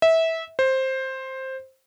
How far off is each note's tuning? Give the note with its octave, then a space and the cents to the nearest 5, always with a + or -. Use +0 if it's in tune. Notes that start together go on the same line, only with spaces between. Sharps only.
E5 -20
C5 +10